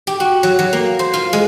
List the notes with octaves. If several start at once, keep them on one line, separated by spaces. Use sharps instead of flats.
G4
F#4
F#3
F#3
A#3
C5
F4
G#3